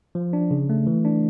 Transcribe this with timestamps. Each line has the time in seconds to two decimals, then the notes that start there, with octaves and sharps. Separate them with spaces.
0.15 F3
0.33 D4
0.51 C#3
0.70 A3
0.87 E3
1.05 D4